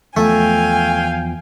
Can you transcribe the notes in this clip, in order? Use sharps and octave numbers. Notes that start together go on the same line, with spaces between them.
E2 F3 A3 F5 G5 G#5